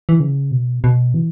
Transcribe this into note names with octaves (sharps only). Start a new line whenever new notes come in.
E3
C#3
B2
B2
E3